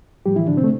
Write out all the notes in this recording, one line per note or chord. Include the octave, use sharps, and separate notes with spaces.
A2 F3 G3 G4
E3 E4
D3 D4
C3 C4
A3